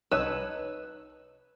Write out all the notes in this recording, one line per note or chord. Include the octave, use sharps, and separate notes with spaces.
C2 D#4 B4 C#5 A5 E6